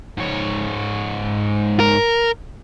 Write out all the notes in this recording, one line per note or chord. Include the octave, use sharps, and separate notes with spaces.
G#2 C#5
A#4